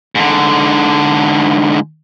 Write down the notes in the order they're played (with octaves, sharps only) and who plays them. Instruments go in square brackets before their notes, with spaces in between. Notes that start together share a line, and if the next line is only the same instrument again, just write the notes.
[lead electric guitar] G#2 D3